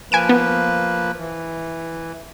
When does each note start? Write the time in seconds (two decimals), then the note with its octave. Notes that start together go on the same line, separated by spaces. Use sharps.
0.12 F3 A#3 B4 G#5 D7 E7
0.29 B3
1.18 E3